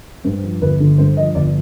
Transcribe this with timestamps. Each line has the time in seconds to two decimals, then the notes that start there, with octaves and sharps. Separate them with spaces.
0.24 G2 C5
0.44 F3
0.61 G1 B4
0.80 D3
0.98 G2 C5
1.17 F3 D#5
1.35 G1 D5